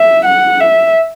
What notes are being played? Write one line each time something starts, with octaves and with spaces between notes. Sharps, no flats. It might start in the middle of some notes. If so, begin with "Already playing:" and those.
Already playing: E5
F#5
E5